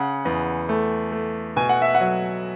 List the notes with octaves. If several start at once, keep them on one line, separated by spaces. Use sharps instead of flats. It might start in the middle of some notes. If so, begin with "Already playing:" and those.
Already playing: C#3 F#5
E2
A3
A3
B2 G#5
F#5
E5
F#5
F#3